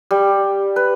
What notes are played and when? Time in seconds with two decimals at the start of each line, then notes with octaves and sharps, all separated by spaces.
0.11 G3
0.76 B4